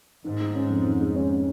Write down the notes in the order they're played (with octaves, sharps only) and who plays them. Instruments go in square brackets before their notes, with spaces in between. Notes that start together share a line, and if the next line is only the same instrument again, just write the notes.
[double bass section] G#2 [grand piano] D#3
[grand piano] G#3
C#4
F2
D#3
G#3
C#4